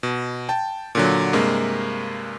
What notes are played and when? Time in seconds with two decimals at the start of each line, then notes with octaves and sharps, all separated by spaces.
0.03 B2
0.49 G5 A5
0.95 A#2 D3 F#3
1.33 G2 C3 G#3 A#3